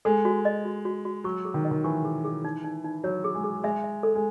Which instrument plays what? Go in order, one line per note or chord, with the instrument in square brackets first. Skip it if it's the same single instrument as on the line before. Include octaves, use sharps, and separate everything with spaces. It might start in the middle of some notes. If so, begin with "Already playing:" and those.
[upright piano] G#3 [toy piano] A4
[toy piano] F#4
D#5
F#4
F#4
F#4
[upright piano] F#3 [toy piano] C#6
[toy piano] G#4
[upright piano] D#3
[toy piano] D#5
[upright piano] D#3
[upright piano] E3 [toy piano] C#6
[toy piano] G#4
G#4
D#4
D#4
D#4
[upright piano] F#3 [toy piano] C#5
[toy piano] G#4
[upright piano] G#3
[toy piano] G#4
[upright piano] G#3 [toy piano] E5
[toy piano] E5
A4
[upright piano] G#3